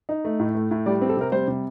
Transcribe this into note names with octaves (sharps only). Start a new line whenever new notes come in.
D#4
A3
A2
A3
A2
G3 D5
C4
A4
C3 A#4
G3 C5
C3